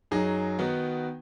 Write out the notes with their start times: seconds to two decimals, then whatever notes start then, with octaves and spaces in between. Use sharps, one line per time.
0.11 F#2 F#3 D#4 G#4
0.59 D#3 B3 D#4 F#4